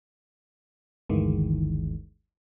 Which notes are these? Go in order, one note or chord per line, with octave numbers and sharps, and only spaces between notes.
G1 D2 D#3 E3 G#3